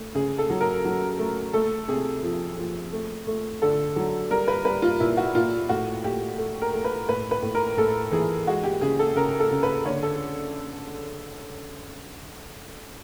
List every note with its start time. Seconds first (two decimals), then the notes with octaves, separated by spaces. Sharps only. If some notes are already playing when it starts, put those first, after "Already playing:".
Already playing: A3
0.15 C#3 G#4
0.38 A4
0.50 F#3
0.61 A#4
0.85 F#3
1.19 A3
1.53 A3 A4
1.88 C3 G#4
2.23 F3
2.58 F3
2.93 A3
3.27 A3
3.62 D3 A4
3.96 F#3
4.30 G3 A#4
4.48 B4
4.65 G3 B4
4.82 F4
5.00 A#2 E4
5.17 F#4
5.35 A#2 F4
5.69 A2 F#4
6.04 A2 G4
6.38 A3
6.62 A#4
6.73 A3
6.84 B4
7.08 A2 B4
7.31 B4
7.42 A2
7.55 A#4
7.77 A2 A4
8.12 E3 G#4
8.47 G#3 F#4
8.64 G4
8.81 C#3 G#4
8.99 A4
9.16 C#3 A#4
9.40 A4
9.51 C#3
9.63 B4
9.85 D3 C#5
10.03 A4